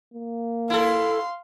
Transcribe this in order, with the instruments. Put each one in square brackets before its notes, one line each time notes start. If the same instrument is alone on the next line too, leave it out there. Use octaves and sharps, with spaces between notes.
[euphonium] A#3
[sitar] E4 A4 [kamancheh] F5 C6